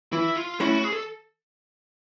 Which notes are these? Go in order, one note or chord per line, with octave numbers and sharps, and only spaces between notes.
E3 E4
F4
A3 C#4 E4 F#4
G#4
A4